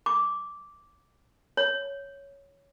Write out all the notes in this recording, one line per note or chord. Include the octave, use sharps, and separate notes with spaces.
D6
C#5